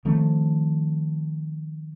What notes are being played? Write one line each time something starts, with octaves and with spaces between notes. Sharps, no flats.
D#3 F3 A3 C4